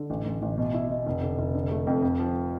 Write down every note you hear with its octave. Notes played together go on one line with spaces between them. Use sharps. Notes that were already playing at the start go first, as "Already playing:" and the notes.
Already playing: D3
A1
A1
A1
B2
E4
B2
F1
D3
F1
D3
A3
F2
F2
F3